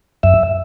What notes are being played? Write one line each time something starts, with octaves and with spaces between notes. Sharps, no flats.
F#2 E5